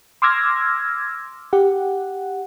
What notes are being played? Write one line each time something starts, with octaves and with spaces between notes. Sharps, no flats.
C6 D6 E6 F6 G#6 A#6
G4 F#5